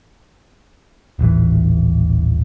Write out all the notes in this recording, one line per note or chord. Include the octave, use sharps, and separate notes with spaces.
D#1 A1 E3